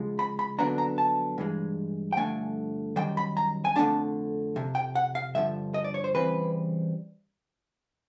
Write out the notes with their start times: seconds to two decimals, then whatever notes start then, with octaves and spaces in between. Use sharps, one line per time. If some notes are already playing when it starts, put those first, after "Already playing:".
Already playing: C#3 F3 G#3
0.19 B5
0.39 B5
0.59 F2 D3 F#3 B3 D4 A#5
0.78 A#5
0.98 A5
1.38 G2 E3 G#3
2.13 G5
2.17 G2 D3 F3 A3 G#5
2.96 F#2 D#3 G3 G5
3.17 B5
3.37 A#5
3.65 G#5
3.76 F2 D3 F#3 A3 D4 A5
4.56 F2 C3
4.75 G5
4.95 F#5
5.15 F5
5.35 G2 D3 F3 E5
5.74 D#5
5.84 D5
5.94 C#5
6.04 C5
6.15 C#3 E3 G3 C4 B4